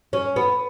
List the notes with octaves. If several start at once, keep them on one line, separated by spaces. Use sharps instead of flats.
C#4
B3